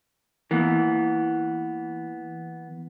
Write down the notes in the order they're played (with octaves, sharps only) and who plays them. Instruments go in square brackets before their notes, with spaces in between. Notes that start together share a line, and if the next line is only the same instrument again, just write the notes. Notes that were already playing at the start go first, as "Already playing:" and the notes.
[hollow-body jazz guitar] E3 A#3 B3